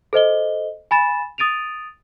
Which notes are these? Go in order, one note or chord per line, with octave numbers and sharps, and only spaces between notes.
A4 C5 D#5 G7
G#5 B5 A6 E7
D#6 A6 D7 D#7 F7